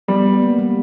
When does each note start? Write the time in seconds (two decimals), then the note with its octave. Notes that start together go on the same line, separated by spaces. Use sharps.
0.08 G3 B3
0.26 B3
0.42 A#3
0.58 G3